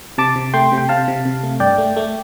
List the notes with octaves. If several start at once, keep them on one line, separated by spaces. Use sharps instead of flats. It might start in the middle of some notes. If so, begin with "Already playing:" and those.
C3 A5 D6
C3
A3 G5 C6
C3
G5
C3 F5 A5
C3
C3
A3
G2 D5 G5
A3
A3